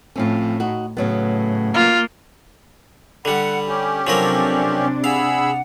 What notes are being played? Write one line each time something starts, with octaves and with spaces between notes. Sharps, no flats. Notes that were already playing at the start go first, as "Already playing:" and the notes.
A2 F3 C4 C#4
D#4 F#4
A2 C#3 F#3 B3
A#3 F4
D3 G3 F#5 B5
C#4 G4
C3 F3 F#3 D4 A4 A#4
G#4 F5 F#5 B5 E6